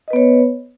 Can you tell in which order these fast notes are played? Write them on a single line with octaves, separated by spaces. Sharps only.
D#5 B4 B3 C#5